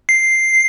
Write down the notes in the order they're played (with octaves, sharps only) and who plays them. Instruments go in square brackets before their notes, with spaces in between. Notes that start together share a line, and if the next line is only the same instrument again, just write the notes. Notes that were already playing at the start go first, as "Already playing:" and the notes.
[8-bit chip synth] C7